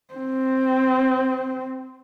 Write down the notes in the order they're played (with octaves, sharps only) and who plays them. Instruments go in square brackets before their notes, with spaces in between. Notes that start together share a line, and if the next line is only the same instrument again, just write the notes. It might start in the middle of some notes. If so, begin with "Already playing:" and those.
[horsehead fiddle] C4